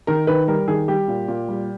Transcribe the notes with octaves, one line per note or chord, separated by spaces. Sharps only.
D#3 A#4
D#3 B4
G3 A#4
D#3 G#4
G3 G4
A#2
A#2
G3